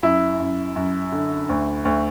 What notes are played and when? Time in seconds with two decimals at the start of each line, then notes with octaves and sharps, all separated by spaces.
0.03 F#2 E4
0.40 F#2
0.76 F#2
1.12 D3
1.49 D2
1.85 D2